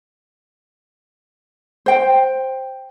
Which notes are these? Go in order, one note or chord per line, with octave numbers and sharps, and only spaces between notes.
C5 G5